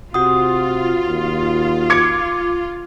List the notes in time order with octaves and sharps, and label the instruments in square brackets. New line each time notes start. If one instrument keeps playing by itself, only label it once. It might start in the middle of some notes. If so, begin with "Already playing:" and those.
[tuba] C3 [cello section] F4 [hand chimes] F#4 F#5 D#6
[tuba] D#2
[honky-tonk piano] D6 G#6 C#7